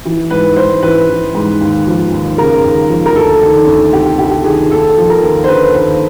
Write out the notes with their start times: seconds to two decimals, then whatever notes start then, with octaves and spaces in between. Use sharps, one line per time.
0.05 E3
0.30 G#2 B4
0.56 G#2 C5
0.82 E3 B4
1.09 E3
1.35 G#2
1.60 D#2
1.87 F3
2.12 D#2
2.38 C#3 A#4
2.64 D#2
2.89 F3
3.06 A#4
3.15 D2 A4
3.41 D#3
3.67 D2
3.93 C3 G4
4.18 D2 G4
4.45 D#3 G#4
4.71 D#2 A4
4.97 F3
5.10 A#4
5.23 D#2
5.44 C5
5.48 D3 B4
5.74 D#2 C5